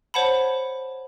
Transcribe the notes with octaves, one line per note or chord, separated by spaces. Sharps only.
C5 C#5 F#5 A5 B5